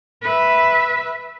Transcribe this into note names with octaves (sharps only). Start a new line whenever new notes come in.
B4 E5